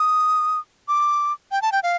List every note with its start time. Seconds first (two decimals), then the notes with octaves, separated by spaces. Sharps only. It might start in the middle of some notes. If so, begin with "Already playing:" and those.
Already playing: D#6
0.88 D6
1.52 G5
1.62 A5
1.72 G5
1.83 F5